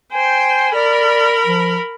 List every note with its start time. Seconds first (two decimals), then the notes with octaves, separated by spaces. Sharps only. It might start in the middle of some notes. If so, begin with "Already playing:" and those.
0.13 C5 G5 G#5
0.74 A#4 D5 B5
1.46 F3